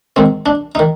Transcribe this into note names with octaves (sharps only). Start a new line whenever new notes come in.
G#2 D#3 C4
D4
D#3 D#4